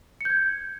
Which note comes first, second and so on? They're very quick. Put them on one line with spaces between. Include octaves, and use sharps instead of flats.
C#7 G6 G#6